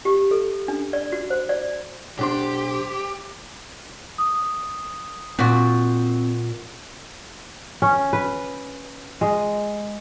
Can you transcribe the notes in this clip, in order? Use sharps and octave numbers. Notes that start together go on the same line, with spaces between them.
G4
A4
D4
D5
F#4
C5
D5
B1 D4 G4 C5 C6
D#6
A#2 C4 F#4
C#4
B4
G#3